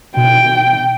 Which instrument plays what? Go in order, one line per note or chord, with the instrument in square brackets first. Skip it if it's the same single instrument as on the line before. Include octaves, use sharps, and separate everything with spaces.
[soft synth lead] B2 [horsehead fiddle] G5